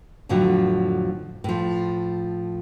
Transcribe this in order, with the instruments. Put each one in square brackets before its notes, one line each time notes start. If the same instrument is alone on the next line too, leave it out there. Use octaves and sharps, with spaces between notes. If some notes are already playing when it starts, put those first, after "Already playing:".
[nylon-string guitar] F2 A2 D3 F3 F#3
A2 F3